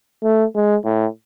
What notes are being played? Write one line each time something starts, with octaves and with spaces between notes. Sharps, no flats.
A3
G#3
A2